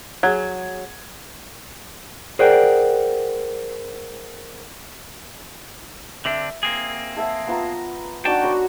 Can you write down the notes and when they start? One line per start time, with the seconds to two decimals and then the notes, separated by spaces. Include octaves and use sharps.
0.23 F#3 G#4 G#6
2.39 G#4 A#4 C5 D5 F#5 G5
6.25 D3 C4 D4 E5
6.63 A#3 C4 G#4
7.17 A4 E5 F#5
7.47 B3 F4 A#5
8.25 D4 D#4 F#4 D5 G5 A5
8.44 A#4 C#5 B5